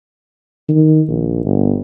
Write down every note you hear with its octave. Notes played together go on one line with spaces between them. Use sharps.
D#3
A#1
G1